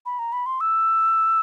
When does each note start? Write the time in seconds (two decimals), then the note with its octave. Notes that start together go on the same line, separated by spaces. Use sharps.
0.06 B5
0.19 A#5
0.33 B5
0.46 C6
0.61 E6